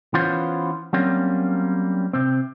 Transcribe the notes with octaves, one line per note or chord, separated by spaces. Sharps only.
E3 B3 C#4 F4 C5
F#3 G3 A#3 C4 C#4
C3 C4